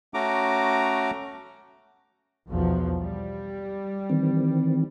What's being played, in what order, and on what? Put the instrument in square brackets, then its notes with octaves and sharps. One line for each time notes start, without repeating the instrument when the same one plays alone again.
[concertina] A3 C#4 F#4 A#5 D6
[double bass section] B1 E2 F3
G3
[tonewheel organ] D#3 E3 C4